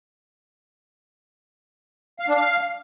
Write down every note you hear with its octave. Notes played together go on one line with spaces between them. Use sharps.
F5
D4
F5